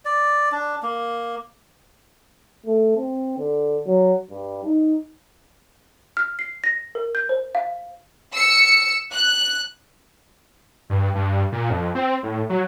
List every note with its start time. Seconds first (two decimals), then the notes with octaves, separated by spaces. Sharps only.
0.05 D5
0.52 D4
0.83 A#3
2.66 A3
2.97 C4
3.38 D3
3.87 F#3
4.30 G2
4.64 D#4
6.17 F6
6.39 C7
6.64 A#6
6.95 A#4
7.15 G6
7.29 C5
7.55 F5
8.34 E6 C#7
9.12 F#6
10.90 G2
11.15 G2
11.52 A#2
11.70 F2
11.95 C4
12.23 A2
12.50 F#3